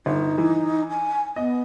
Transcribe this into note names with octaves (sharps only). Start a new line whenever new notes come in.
G1 D#4
E3
G#5
B3 D#5